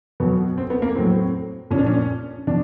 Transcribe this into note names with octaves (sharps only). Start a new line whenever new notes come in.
B2 F#3 B3
C4
B3
A#3
A2 F#3 C4
A#2 F3 C#4 D4
C#4
B2 D4